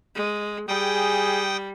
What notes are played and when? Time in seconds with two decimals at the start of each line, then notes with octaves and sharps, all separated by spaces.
0.15 G#3
0.68 G3 G#4 G5 D#6